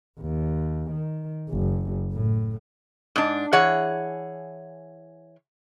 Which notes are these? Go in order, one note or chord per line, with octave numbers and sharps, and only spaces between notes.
D#2
D#3
F#1
A2
G#2 D4
E3 G#4 C#5 F#5